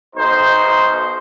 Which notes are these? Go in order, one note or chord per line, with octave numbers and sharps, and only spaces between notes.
B1 D#4 C5